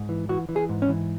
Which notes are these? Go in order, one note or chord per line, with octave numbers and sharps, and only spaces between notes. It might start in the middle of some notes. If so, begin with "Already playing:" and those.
Already playing: G#2
E3
E3 F#4
E3
G#4
G#2
C#4
E3